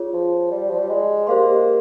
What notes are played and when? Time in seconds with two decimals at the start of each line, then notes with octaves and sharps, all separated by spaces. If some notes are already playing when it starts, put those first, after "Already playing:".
Already playing: F4 G#4 C#5
0.13 F3
0.51 G3
0.69 F3
0.79 G3
0.89 G#3
1.27 A#3 G4 C5 F5 C6